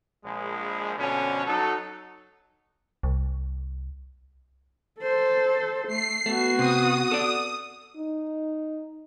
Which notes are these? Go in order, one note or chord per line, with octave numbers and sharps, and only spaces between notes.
A#1 G#3
F2 B2 D3 C#4
F#3 D#4 A4
C2
A4 C5
A3 C7
A3 B3 F#4
C3 D#6
A4 D5
D#4